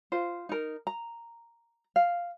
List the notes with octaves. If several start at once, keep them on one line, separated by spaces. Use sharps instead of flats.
F4 C5
D#4 A#4
A#5
F5